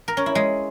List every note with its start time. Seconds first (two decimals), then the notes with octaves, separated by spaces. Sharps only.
0.08 A#4
0.17 C#4
0.26 E4
0.35 G#3